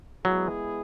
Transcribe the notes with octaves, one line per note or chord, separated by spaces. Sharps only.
F#3 G#3 B3 E4 G#4